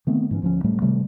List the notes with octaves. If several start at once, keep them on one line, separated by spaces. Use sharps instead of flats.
D#3 A3 B3 C4
G#2 E3 C#4
D2 F3 C#4
A2 G3 A3
C3 D#3 G3 A3